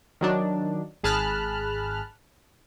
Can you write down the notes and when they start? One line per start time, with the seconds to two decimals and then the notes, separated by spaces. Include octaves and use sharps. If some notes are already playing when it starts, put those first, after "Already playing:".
0.21 D#3 F#3 D4 D#4
1.03 G#1 G#4 A5 B5 F6 F#6